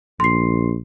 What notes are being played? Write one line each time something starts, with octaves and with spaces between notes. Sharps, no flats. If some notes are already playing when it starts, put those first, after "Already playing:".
A#1 C6 C7